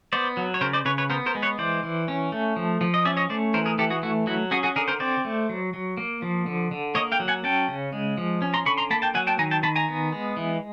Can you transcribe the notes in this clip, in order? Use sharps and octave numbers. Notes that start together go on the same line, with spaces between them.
B3 C5 D5
F#3
C#5
C#3 A#4 C5
C5 D5
C#3 B4 C#5
B4 C#5
B3 A#4 C5
A#4 C5
G#3
B4 C#5
E3 C5 D5
E3
C#4
A3
F3
F3
D#5
C#4 D5 E5
C#5 D#5
A3 C5 D5
E3 A#4 C5
G#4 A#4
E3 G4 A4
F#4 G#4
A3 E4 F#4
F#3 E4 F#4
C#4 F#4 G#4
F#4 G#4
D3 G#4 A#4
A#4 C5
C4 C5 D5
A3
F#3
F#3
A#3
F3
D3
D3
A#3 C#5 D#5
F5 G5
F#3
F#5 G#5
C#4 G5 A5
C#3
G#3
F3
C#4
A#5 C6
D3 B5 C#6
A#5 C6
A#3 A5 B5
G5 A5
F#3 F#5 G#5
G5 A5
D#3 G#5 A#5
G5 A5
D#3 A5 B5
G#5 A#5
B3
G#3
E3